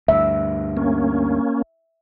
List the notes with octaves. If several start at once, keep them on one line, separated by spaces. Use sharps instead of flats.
D2 G2 E5
A#3 C#4